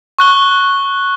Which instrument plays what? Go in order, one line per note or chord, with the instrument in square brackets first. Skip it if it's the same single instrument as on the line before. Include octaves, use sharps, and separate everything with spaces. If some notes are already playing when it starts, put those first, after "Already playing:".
[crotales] C#6 F#6 G7